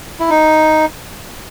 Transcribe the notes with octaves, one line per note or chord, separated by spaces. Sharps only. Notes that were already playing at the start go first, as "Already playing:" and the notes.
E4
D#4